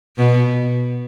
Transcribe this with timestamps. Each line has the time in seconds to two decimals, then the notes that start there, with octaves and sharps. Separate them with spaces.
0.17 B2